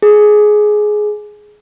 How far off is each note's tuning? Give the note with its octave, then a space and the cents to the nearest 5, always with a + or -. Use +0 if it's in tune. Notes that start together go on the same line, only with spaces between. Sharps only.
G#4 +15